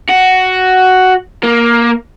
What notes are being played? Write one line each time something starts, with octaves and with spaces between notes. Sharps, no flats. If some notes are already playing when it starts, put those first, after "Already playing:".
F#4
A#3